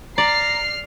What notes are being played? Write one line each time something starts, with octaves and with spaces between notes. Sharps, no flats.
D5 A#5 F6 C7